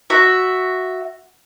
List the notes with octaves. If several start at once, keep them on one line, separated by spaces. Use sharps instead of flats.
F#4 E5